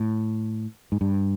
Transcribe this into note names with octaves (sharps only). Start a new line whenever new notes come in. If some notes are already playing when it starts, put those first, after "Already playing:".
Already playing: A2
G#2
G2